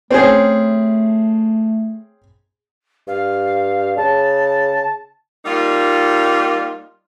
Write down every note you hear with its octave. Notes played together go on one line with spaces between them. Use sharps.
A3 C4 C#4 G#4
G2 F5
C#3 A5
G3 A#3 D#4 F4